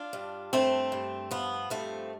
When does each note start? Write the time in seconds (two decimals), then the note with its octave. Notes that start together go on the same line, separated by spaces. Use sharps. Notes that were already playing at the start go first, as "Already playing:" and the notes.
Already playing: D4 F4
0.13 G2
0.53 G2 A3 C4
0.92 G2
1.31 F3 B3
1.70 G2 A3 C4